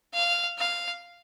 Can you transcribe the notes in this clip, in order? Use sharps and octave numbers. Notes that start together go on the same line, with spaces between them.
F5
F5